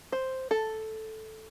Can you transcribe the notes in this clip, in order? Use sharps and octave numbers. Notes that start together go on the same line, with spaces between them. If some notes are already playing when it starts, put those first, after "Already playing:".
C5
A4